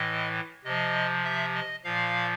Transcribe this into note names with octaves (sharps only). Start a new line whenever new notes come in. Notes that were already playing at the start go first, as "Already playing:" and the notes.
Already playing: A2 E3 D#5
C3 F3 D#5
E5
D#5
A#2 F3 F5